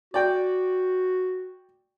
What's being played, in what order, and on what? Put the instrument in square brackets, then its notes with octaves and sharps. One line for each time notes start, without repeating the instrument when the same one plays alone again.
[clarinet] F#4 [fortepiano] D5 G5